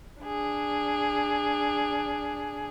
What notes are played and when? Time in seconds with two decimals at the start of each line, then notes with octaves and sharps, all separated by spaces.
0.23 D4 G#4